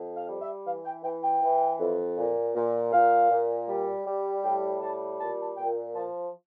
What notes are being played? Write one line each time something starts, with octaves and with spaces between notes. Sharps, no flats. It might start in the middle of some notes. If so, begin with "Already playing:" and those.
Already playing: F2
F5
G3
E5
E3 F5
G5
E3 G5
G5
E3
F2
A#2
A#2
A#2 F5
A#2
G3
G3
A2 G5
G3 A5
A#2 A5
A5
A#2 G5
F3 A5